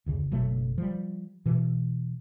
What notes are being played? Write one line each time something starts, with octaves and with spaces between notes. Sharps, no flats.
F1 D2 C#3
F#1 B2 F#3 A3
F3 G3
B2 E3